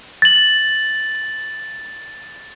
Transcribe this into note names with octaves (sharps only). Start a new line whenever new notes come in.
A6 F#7